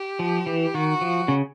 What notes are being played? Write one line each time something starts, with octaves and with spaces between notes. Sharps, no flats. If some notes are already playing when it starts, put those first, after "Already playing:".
Already playing: G4
F3
E3
D#3 F#4
F3
C#3